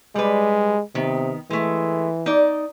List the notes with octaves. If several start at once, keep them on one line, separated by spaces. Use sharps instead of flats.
G3 G#3 B4
C3 D#3 B3
E3 G#3 A3
D#4 D5